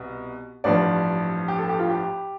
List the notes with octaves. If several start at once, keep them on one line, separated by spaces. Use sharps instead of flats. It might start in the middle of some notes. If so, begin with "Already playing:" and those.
Already playing: C2 B2
A1 G2 F3 D5
G4
A4
G4
F4
G4